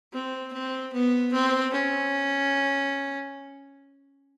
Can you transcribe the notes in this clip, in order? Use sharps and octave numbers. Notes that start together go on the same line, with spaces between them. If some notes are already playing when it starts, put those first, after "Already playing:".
C4
C4
B3
C4
C#4